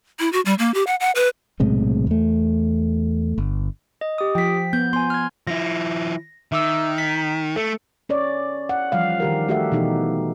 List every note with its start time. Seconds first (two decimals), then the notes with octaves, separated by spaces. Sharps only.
0.20 E4
0.33 F#4
0.45 G3
0.59 A#3
0.74 G4
0.87 F#5
1.00 F#5
1.15 B4
1.60 B1 A2 C3 G#3
2.07 E2 A3
3.38 G1
4.01 D#5
4.18 G4 D#6
4.35 F3 G5 B6
4.73 B3 G6
4.93 B3 G#5 C6
5.10 F6 G#6
5.47 F3 E4 A#6
6.52 D#3 E5 D6 E6
6.98 A#5 B6
7.56 A3 A4 C#7
8.09 C#4 C#5 D5
8.69 F#5
8.92 E3 F3 G3 F5
9.20 D#3 G4 A#4
9.48 A3 F#4 G4 A4 E5 F#5
9.72 B2 E3 D#4 G4